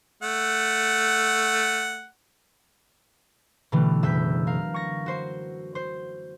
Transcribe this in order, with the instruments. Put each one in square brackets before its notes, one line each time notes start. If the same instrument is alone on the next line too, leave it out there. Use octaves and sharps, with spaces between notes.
[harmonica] A3 F#5
[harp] B2 D3 E3 G3 A3
F#1 E5 E6 G6 B6
A#4 F5
C#6 A#6
F#4 C5 C6
C5